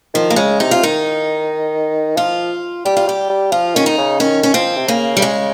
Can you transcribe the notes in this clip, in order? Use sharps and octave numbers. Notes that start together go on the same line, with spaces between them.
D#3 F3
A#3
C#3 G#3
C3 D#4
F4
D#3 D#4
F3 F4
G3 G4
F4
G3 G4
G3
F3 F4
D#3 C#4
D#4
C#3
D#3 C#4
C#4
F3 C4
C3
C#3 A#3
G3
G#3